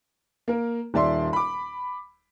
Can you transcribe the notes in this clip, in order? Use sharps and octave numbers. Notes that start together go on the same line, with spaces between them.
A#3 A#4
D#1 D5 E5 C6
B5 D6